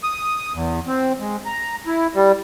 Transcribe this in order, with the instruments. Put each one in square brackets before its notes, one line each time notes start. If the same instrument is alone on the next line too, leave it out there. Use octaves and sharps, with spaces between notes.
[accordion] D#6
E2
C4
G#3
A#5
E4
G3